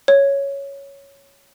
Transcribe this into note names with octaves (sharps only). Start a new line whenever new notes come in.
C#5